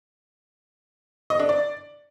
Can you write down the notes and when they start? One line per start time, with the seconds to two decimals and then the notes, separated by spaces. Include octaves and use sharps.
1.30 D#5
1.40 D4
1.49 D5